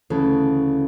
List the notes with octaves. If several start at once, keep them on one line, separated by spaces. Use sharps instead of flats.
D2 C#3 E3 A4